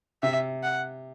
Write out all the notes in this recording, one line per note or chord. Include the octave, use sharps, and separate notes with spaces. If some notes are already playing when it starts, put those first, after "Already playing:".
C3 E5
F#5